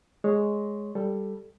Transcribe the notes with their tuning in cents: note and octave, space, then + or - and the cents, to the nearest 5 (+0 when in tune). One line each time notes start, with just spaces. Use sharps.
G#3 +0 C#5 +0
G3 +0 A4 +0